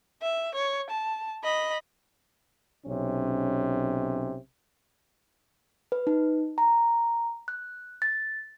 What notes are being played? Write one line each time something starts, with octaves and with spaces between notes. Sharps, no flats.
E5
C#5
A5
D#5 B5
B1 C3 C#4
B4
D#4
A#5
F#6
A6